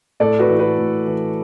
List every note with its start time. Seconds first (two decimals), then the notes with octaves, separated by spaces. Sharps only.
0.20 A2 A4 D5
0.39 F#4 B4
0.49 E3
0.59 F#4 B4
0.79 A2
1.07 E3